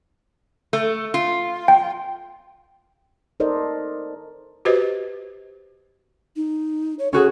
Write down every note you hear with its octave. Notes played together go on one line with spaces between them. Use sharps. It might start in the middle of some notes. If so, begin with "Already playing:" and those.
A3
F4
G5
D#4 A4 A#4 C5 D5 D#5
F#4 G4 B4 C5 D#5
D#4
C#5
C#4 F#4 G#4 A4